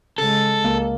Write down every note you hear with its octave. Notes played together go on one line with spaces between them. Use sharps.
C#3 G#3 A4
C#2 A#3